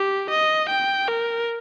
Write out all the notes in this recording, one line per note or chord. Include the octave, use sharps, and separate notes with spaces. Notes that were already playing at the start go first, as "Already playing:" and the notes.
Already playing: G4
D#5
G5
A#4